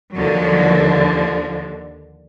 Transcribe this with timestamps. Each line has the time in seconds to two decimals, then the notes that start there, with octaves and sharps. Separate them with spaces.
0.14 D#2 D3 F3 F#3
1.03 F3